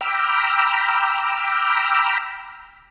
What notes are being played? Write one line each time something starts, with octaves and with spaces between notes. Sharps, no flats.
G5 A#5 B5 D6 E6 F6